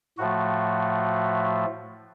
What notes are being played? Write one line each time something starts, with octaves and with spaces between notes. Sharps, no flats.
A2 F3 A3 F#4